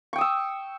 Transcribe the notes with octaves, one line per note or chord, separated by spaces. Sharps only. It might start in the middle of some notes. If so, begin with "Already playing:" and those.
G5 C#6 D#6 E6